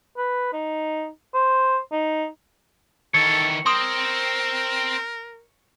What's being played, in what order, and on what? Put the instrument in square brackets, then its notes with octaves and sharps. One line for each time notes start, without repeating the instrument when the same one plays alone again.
[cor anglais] B4
D#4
C5
D#4
[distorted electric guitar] D#3 E3 [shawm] A4 [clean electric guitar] C#5
[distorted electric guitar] C4 [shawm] A#4 [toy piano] C6 D#6